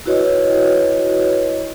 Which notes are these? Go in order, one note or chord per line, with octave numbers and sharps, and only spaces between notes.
E4 F#4 B4 C#5 D#5